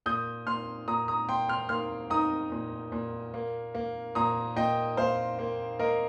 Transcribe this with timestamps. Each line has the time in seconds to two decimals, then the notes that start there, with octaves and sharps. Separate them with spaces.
0.06 A#2 D#6 G6
0.47 A#2 C6 F6
0.88 A#2 A#5 D#6
1.08 A#5 D#6
1.29 A#2 G5 C6
1.49 C6 F6
1.69 A#3 C6 F6
2.10 D#4 A#5 D#6
2.52 A#2
2.92 A#2
3.34 A#3
3.75 A#3
4.15 A#2 A#5 D#6
4.56 A#2 D#5 G5
4.97 A#2 C5 F5
5.39 A#3
5.79 A#3 A#4 D#5